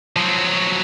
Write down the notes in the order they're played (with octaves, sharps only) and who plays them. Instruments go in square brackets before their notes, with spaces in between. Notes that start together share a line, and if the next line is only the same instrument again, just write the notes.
[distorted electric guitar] F3 F#3